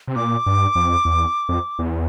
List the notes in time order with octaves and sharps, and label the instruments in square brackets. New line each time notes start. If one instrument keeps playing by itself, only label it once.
[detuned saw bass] C3
[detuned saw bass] A#2 [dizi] D6
[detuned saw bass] G2
F2
E2
F2
E2